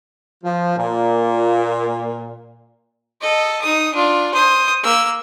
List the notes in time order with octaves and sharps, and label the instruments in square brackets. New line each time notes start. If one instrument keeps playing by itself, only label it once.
[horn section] F3
A#2
[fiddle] A4 D#5
D#4 D#6
D4 F4
C5 D#6
A#3 E6